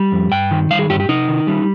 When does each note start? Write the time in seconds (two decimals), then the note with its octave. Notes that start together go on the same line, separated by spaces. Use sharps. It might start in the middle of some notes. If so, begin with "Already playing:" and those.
Already playing: G3
0.12 F2
0.32 G2 G5
0.51 D#3
0.70 G3 F5
0.79 G#4
0.89 G2 G4
1.00 G4
1.09 C3 D#4
1.28 D#3
1.47 G3